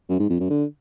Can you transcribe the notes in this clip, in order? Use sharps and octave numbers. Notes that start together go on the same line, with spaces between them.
F#2
G#2
F2
F#2
D3